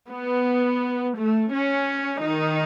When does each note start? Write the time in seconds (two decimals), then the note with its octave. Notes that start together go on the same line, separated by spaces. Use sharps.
0.11 B3
1.18 A3
1.53 C#4
2.24 D#3 D#4